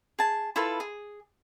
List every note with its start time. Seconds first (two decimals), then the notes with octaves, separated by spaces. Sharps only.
0.19 G#4 A5
0.56 E4 F4 A4 B4
0.80 G#4